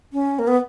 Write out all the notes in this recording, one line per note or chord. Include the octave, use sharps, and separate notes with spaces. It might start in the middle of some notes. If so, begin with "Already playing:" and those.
C#4
A#3
B3